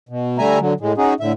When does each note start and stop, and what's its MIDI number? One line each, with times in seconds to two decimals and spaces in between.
0.09 0.38 47
0.38 0.59 50
0.38 0.59 55
0.38 0.59 57
0.38 0.59 76
0.38 0.59 80
0.38 0.59 82
0.60 0.73 50
0.60 0.73 54
0.80 0.93 45
0.80 0.93 56
0.98 1.14 61
0.98 1.14 63
0.98 1.14 66
0.98 1.14 68
1.20 1.32 45
1.20 1.32 50
1.20 1.32 76